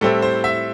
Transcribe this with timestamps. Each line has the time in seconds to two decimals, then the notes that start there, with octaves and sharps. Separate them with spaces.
0.01 A2 G3 C4 E4 A4
0.22 C5
0.44 E5